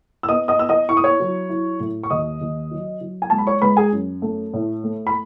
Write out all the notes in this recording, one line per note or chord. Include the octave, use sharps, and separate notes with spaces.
E6
B3 D#5 D#6
D#5 D#6
B3 E6
D#5 D#6
E4 C#6
D#6
C#5 C#6
F#3
E4
A2
C#6
D#2 D#5 D#6
D#2
F#3
F#3
G#5
G#3 A5
B5
C#5 C#6
G#3 B4 B5
G#4 G#5
F#2
A3
A2
A3
B5